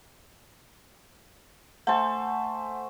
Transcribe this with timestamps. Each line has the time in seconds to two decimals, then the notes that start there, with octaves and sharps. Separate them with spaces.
1.87 A3 C5 F#5 G#5